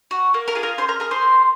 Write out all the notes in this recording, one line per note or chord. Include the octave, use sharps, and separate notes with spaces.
F#4
A#3
A#4 A#5
F4 G#4
A#4 A#5
C#4 C5 C6
A#4 A#5
G#4 A#4 A#5
C5 C6
A#3